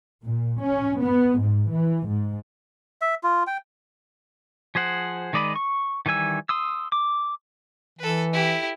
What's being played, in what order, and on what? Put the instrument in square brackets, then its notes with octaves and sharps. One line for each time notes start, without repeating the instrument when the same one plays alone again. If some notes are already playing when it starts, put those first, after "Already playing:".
[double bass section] A#2
C#4
B3
G#2
E3
G#2
[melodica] E5
F4
G5
[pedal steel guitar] F3 G#4 C5 F#5
D#3 G#3 D5 D#5 B5
C#6
D#3 E3 G3 G#5 E6
C6 D#6 E6
D6
[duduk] E3 [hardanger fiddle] A4 B4
[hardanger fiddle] E4 G4